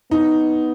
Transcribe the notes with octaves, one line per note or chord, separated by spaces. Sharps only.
B3 D#4